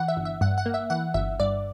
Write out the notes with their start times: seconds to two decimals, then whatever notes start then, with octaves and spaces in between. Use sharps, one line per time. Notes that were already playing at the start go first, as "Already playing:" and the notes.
Already playing: E3 F#5
0.08 E5
0.17 G1
0.25 E5
0.41 G2 F#5
0.58 F#5
0.66 A#3
0.74 E5
0.90 E3 F#5
1.14 G1 E5
1.40 G2 D5